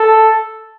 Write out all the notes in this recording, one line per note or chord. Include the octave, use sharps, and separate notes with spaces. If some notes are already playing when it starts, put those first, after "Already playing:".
Already playing: A4